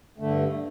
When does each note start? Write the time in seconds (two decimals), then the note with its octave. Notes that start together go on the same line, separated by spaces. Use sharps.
0.18 G2 D3 A3